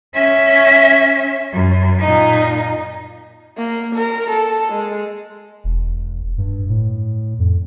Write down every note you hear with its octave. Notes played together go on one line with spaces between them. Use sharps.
C#4 E5
F#2
A#2 D#4
A#3
A#4
A4
G#3
E1
G2
A2
F2